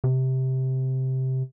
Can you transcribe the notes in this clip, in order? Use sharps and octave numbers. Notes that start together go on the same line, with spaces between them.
C3